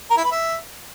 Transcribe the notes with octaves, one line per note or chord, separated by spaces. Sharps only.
A#4
E4
B4
E5